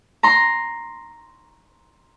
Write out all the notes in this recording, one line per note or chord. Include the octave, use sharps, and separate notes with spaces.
A#5 C6